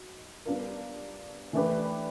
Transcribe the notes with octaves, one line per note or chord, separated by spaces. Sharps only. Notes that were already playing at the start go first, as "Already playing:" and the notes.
Already playing: D#4 F#4
G3 B3 D4 F4 A#4
E3 A3 D4 G4 B4